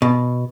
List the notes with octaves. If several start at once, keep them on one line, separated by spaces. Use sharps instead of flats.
B2